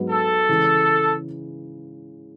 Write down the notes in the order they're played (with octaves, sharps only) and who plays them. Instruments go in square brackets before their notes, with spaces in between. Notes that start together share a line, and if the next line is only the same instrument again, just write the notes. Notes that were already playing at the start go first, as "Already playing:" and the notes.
Already playing: [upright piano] G#2 F#3 B3 F#4
[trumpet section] A4
[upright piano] C#3 E3 G#3 C#4